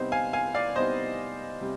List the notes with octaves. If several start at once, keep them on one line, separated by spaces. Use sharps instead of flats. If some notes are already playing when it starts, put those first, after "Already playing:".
Already playing: C3 G3 B3 D#4 C5
F5 G#5
F5 G#5
D5 F5
C3 G3 B3 D#4 C5 D#5
C3 G3